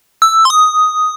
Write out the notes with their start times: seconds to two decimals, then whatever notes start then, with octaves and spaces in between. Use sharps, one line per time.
0.22 E6
0.45 C6
0.50 D#6